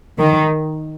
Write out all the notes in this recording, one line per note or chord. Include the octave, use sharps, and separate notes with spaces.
D#3